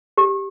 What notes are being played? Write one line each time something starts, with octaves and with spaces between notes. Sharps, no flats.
G4